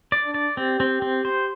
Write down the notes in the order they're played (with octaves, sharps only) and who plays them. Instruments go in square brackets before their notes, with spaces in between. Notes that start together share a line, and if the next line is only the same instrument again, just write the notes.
[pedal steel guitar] D5
[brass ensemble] D4
[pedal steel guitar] D5
[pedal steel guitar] C4 [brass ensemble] G4
[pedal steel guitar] C4
C4
C5